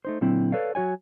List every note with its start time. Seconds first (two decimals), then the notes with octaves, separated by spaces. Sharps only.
0.05 A3 D#4 C5
0.21 A#2 D3 F#3 C4 E4
0.52 A4 B4 C#5 D5 F5
0.75 F#3 F#4 C#5 G#5